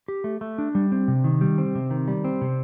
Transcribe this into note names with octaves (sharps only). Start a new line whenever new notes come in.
G4
A3
A3
D4
G3
C4
C3
D#3
G3
C4
C3
D#3
G3
C4
C3